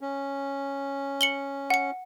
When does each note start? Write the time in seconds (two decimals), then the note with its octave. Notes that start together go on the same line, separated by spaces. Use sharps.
0.01 C#4
1.21 C#7 F#7 G7
1.70 F#5 C#7